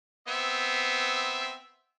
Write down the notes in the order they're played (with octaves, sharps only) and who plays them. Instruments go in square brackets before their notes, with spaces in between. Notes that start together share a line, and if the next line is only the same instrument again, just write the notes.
[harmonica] B3 C4 E5